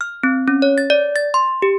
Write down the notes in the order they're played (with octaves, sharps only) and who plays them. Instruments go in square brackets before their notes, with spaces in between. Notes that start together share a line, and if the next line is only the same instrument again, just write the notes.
[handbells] F6
C4
C#4
C#5
A6
D5
A6
C6
G4